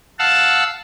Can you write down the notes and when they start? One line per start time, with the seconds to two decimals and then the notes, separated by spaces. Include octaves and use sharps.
0.19 F5 F#5 A5 E6